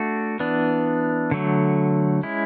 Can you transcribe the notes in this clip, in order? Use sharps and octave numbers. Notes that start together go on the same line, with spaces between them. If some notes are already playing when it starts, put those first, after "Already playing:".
Already playing: A3 D4 F#4
E3 B3 D4
D3 F#3 A3
G#3 C#4 E4